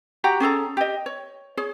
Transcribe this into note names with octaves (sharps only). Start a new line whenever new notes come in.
F#4 G4 F#5 A#5
C#4 G#4 A4 A#5
G4 D#5
C#5
G#4 C#5